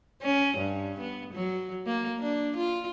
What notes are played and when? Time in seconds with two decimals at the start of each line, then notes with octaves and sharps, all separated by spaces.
0.22 C#4
0.57 G2
1.00 B3
1.34 F#3
1.86 A#3
2.20 D4
2.57 F4